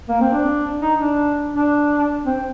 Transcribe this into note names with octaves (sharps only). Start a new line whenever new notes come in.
A#3
C4
D4
D#4
D4
D4
C4